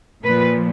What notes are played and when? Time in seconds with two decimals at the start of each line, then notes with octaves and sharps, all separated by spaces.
0.24 A#2 F3 B4